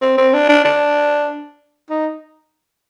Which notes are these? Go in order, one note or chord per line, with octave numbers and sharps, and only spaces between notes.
C4
C4
D4
D4
D4
D#4